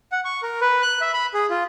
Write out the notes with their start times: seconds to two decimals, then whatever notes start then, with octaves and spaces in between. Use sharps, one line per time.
0.12 F#5
0.25 C#6
0.43 A#4
0.61 B4
0.82 F#6
1.01 E5
1.13 B5
1.34 G#4
1.50 F4